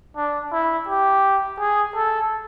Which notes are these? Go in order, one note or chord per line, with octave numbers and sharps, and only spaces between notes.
D4
E4
G4
G#4
A4